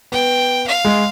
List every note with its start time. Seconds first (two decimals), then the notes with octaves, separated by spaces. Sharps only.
0.12 B3 G5
0.67 F5
0.85 G#3